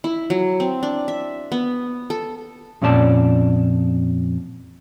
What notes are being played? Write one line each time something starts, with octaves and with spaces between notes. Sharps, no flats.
E4
F#3
C4
D4
E5
B3
A4
F2 A#2 C#4 D5 A5